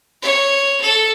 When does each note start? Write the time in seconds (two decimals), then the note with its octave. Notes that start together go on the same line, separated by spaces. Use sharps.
0.22 C#5
0.82 A4